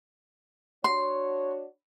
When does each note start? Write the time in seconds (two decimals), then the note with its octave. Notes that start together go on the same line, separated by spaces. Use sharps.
0.84 D4 F#4 C#5 C6